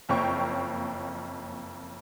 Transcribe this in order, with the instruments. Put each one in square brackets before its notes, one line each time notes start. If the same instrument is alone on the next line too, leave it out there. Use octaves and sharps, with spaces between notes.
[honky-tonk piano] F#1 F2 A#3 C#5 G5 C#6